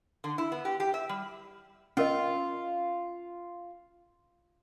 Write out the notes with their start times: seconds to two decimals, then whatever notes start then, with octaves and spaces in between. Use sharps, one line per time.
0.24 D3
0.38 E4
0.52 B3
0.65 G4
0.80 G4
0.94 E5
1.09 G3
1.97 C#4 F4 A#4 D#5